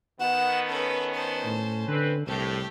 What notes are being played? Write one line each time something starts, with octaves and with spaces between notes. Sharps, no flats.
D#3 B3 F#5 E7
C#4 A4 B4
C5 A5
A2
D3 C4 B4
C2 A2 A3 G4